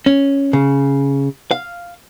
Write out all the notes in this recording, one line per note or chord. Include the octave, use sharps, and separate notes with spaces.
C#4
C#3
F5